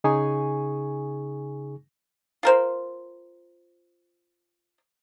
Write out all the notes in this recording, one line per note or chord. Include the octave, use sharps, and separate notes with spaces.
C#3 D#4 G#4 G#5 C#6
F4 A#4 C5